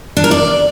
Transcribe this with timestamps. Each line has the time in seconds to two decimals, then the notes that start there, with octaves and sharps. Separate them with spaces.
0.17 D4
0.24 A#4
0.31 D5